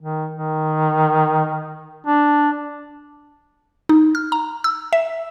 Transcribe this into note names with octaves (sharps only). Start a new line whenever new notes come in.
D#3
D#3
D4
D#4
F6
A#5
E6
E5